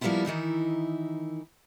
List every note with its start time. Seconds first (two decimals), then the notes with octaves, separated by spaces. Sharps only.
0.01 F3 G3 A#3 B3 E4 F4
0.25 D#3 E3 D#4 E4